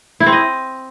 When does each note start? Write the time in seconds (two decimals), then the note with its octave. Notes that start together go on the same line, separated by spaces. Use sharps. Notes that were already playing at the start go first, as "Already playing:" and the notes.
0.20 E4
0.26 C4
0.32 D#5